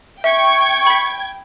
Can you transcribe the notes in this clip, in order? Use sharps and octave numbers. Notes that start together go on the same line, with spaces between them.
E5 G5 C#6 G#6
B5 B6